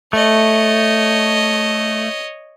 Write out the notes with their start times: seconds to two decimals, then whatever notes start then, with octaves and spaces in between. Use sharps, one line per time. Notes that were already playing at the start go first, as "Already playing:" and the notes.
0.13 A3 C#5 D#5